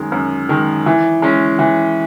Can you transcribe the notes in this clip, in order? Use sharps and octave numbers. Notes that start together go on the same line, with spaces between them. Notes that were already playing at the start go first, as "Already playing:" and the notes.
Already playing: F#2 D#3 G#3
F#2
D#3 G#3
E3
G#3 C#4
E3